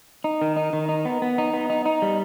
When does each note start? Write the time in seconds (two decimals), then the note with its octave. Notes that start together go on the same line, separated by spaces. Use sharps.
0.24 D#4
0.42 D#3
0.57 D#4
0.73 D#3
0.89 D#4
1.05 B3
1.22 B3
1.38 D#4
1.54 B3
1.70 D#4
1.86 D#4
2.02 G3